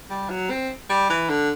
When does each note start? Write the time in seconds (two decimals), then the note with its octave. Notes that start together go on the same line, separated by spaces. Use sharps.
0.10 G3
0.30 F#3
0.50 C4
0.90 G3
1.10 E3
1.30 D3